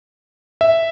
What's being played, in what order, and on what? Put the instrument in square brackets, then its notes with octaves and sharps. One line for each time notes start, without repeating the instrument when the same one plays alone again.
[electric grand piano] E5